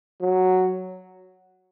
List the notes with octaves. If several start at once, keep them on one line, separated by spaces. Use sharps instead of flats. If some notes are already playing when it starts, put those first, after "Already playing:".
F#3